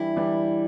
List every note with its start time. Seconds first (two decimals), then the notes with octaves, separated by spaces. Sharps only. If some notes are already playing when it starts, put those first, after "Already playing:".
Already playing: E3 G3 D4 E4 G4
0.16 E3 G3 D4 G4